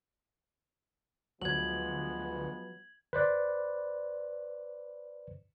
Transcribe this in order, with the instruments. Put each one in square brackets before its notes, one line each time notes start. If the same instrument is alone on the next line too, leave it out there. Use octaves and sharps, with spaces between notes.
[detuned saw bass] D2 [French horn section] F3 G#3 B3 [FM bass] F#3 [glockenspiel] G#6 F#7
[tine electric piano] B4 C5 D5